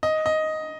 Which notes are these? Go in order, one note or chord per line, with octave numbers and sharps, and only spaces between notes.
D#5
D#5